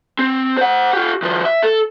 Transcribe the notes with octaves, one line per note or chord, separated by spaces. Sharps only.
C4
C5 F#5
F4 G4
D#3 F3
E5
A4